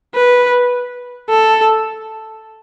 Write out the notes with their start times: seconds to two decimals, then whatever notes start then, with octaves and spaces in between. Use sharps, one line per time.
0.15 B4
1.29 A4